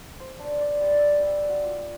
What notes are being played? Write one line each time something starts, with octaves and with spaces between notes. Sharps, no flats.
C5
D4
D5
G3
E5
G3
F#4
F4